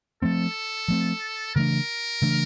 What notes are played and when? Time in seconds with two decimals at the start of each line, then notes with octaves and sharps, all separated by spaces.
0.22 F3 A3 C4 A4
0.88 F3 A3 C4
1.55 C#3 E3 A3 D4 A#4
2.22 C#3 E3 A3 D4